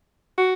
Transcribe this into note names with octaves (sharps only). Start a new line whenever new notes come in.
F#4